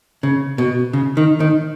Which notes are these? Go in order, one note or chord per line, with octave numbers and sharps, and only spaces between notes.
C#3
B2
C#3
D#3
D#3